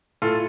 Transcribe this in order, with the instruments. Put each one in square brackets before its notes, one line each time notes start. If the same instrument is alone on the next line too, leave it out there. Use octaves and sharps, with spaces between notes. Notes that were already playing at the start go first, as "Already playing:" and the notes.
[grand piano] A2 F4 A4